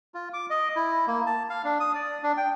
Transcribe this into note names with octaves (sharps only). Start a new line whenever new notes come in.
F4
D6
D#5
E4
A#3
A5
F5
D4
D#6
D5
D4
G5